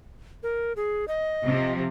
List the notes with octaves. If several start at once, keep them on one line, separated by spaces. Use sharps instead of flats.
A#4
G#4
D#5
C3 F3